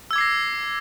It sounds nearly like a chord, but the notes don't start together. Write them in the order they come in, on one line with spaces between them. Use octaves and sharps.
E6 G#6 D6 C7 A#6